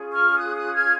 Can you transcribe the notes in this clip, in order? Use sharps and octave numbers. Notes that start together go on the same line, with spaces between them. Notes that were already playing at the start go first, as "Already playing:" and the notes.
Already playing: C#4 F4 G#4
C#6 F6
D#6 F#6
D#6 F#6
F6 G#6